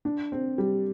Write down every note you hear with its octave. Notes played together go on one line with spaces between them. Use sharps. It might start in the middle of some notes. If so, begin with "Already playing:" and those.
D4
C4
G3